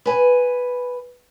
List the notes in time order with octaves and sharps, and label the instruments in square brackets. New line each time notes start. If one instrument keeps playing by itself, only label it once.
[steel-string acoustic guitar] B4 G#5